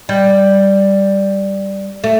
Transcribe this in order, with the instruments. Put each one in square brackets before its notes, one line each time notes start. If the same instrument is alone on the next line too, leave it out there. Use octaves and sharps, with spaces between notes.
[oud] G3
A3